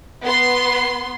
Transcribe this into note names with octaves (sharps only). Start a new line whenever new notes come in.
B3 C6